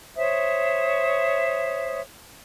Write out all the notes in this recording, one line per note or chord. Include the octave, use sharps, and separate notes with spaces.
C5 C#5 E5 D#6